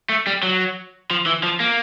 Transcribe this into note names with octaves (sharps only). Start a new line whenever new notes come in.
A3
G3
F#3
F3
E3
F3
A#3